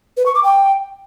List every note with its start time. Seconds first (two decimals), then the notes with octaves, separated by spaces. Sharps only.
0.17 B4
0.26 C#6
0.35 D6
0.44 G5